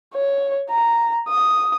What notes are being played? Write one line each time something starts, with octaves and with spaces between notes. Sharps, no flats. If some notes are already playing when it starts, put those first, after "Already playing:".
C#5
A#5
D#6